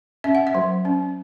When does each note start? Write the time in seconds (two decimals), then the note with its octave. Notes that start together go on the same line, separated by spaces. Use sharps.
0.24 C#4 E5
0.35 F#5
0.47 E5
0.55 F#3
0.85 C#4